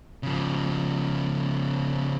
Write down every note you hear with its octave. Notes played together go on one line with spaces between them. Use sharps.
C#3 F3